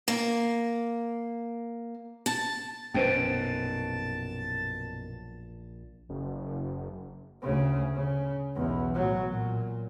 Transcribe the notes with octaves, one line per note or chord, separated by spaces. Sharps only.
A#3
A5
A#1 F#2 B2 B4 C5 G5 A5
F#1
D2 C#3
C#3
B1 E2
A2 F#3
A#2